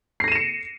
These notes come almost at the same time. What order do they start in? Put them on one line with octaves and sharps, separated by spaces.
C7 A#6 D#7 E7 C#7